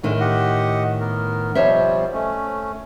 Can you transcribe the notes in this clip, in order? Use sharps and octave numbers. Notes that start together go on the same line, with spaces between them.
A2 D3 D#3 G#3
G4 D#5 F#5
B3 A#4
B2 F3 G3 C5 C#5 E5
A3 C#4